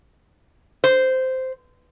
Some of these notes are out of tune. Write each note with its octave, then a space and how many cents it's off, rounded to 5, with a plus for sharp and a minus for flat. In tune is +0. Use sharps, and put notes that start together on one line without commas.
C5 -10